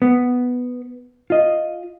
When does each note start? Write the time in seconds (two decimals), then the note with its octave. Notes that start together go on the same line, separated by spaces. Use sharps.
0.02 B3
1.30 F4 D#5